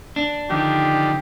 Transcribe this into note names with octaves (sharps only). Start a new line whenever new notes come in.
D4
D3 D#3 F3 G4